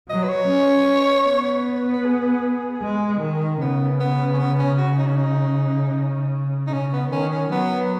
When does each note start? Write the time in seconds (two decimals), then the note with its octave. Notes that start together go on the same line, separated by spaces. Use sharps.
0.09 F#3 D#5
0.24 B4
0.29 C#5
0.48 C#4
1.27 B3
1.93 B4
2.05 G#4
2.82 G#3
3.21 D#3
3.61 C#3 B3
4.00 B3
4.34 C#4
4.39 B3
4.59 C#4
4.78 F#4
4.98 D#4
5.07 C#4
5.16 D#4
6.67 D#4
6.73 C#3 C#4
6.93 B3
7.12 D#3 C#4
7.32 C#4
7.51 F#3 B3